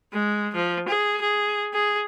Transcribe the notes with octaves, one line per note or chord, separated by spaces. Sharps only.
G#3
F3
G#4
G#4
G#4